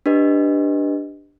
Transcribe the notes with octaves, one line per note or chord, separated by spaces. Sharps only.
D4 G4 B4 D#5